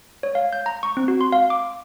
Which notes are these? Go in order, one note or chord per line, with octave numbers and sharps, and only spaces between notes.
C#5
F5
G6
A#5
C#6
C4
F#4
C6
F5
D6